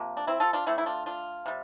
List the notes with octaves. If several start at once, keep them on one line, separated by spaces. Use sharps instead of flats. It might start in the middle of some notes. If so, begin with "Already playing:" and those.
Already playing: C3 F3 A#3
D4
C4 E4
F4 A4
D4 F4
D3 A3 C4 E4
E4
D4 F4
D4 F4
C3 G3